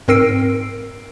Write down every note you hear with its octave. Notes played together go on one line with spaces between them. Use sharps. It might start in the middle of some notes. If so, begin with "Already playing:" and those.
G#2 C4 A#4 E6 C7 D7